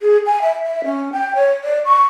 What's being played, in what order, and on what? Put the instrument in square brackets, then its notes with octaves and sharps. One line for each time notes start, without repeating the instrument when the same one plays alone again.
[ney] G#4
G#5
E5
E5
C#4
G5
C#5
D5
C#6